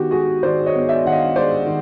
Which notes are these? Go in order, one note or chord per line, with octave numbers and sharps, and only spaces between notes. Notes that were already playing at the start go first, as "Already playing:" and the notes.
Already playing: D#3 B3 F#4 G4
G#3 F#4 G#4
D#3 C5 D5
C#5 D#5
B3
D5 E5
D#3 F#5
D#5 F5
G#3 C5 D5
D#3